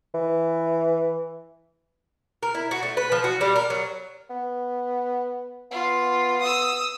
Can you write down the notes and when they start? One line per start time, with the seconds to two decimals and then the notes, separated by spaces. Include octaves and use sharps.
0.14 E3
2.43 A#4
2.55 E4
2.71 F#4
2.83 A3
2.97 B4
3.12 F3
3.24 F#4
3.41 G3
3.56 A#4
3.70 F#3
4.30 B3
5.71 B3 F4
6.41 D#6 E6